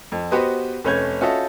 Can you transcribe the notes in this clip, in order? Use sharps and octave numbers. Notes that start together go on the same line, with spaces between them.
F2
B3 F#4 G4 B4 C5 D#5
F1 A3 C#4 B4 G6 G#6
C#4 F4 F#4 A4 D#5 E5